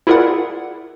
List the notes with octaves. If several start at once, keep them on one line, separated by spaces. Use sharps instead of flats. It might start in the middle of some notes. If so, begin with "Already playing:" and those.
E4 F4 G#4 A#4 D5 F#5